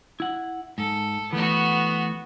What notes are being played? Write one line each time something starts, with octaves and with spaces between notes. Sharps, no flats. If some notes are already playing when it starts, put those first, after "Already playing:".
E4 F#5
G#2 A4
E3 A3 B3 F#4